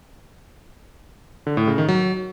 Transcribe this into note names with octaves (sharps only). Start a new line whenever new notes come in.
D3
A2
C#3
D#3
F#3